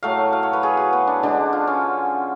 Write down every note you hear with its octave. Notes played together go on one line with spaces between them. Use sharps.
A2 F#3 A3 F5
F5
C#5
B4
G#4
F#4
B3
D4
D3 G#3 D4
F4
C#4